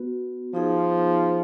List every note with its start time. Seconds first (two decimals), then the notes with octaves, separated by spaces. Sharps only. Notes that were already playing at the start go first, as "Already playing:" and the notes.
Already playing: B3 F#4 B4
0.54 F3 B3 D#4 G#4